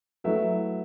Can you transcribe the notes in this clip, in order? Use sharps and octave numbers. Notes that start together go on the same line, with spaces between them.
F#3 A3 E4 B4 E5